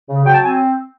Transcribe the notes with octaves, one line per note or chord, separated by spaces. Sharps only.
C#3
F#3 G5
A5
C4 G#5